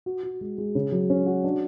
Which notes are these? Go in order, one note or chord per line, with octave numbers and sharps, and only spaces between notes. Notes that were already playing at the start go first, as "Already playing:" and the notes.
F#4
F#4
G#3
G#3
C#3
F#3
C#4
F#4
D4